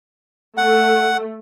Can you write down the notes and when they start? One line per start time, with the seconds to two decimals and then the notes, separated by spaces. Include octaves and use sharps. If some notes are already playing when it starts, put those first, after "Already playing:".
0.57 A3 F#5